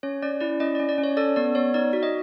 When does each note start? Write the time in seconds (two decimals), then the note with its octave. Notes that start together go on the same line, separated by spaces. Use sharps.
0.03 C#4 C#5
0.23 C#4 D5
0.41 E4 D5
0.60 C#4 D#5
0.75 D5
0.80 C#4
0.89 D5
0.98 C#4
1.04 C#5
1.17 A4 D5
1.36 B3 D5
1.55 B3 C#5
1.74 D#4 D5
1.93 F#4
2.03 D#5